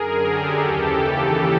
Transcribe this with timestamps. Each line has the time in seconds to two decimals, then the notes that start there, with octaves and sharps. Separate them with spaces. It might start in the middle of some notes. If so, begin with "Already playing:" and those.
Already playing: F#2 D3 G#4 A#4
0.24 G4 A4
0.61 D#2 C#3 E3